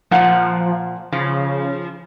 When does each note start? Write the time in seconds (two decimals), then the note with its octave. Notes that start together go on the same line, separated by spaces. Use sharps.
0.11 A#2 F3 F#5
1.12 C#3 F3